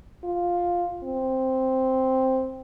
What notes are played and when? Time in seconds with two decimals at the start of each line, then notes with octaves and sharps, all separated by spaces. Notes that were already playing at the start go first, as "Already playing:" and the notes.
0.24 F4
1.04 C4